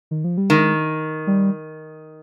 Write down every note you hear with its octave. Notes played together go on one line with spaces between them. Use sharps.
D#3
F3
G3
D#3 G#3
G3